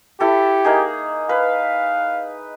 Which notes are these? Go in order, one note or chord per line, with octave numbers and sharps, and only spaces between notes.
E4 G4 A4
A#3 D#4 G#4
B4 F5